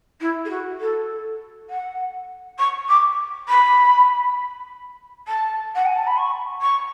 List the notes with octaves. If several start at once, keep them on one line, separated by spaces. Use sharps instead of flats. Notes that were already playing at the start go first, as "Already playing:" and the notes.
E4
G#4
F#4
A4
F#5
C#6
D6
B5
A5
F#5
G#5
A5
B5
C#6
C#6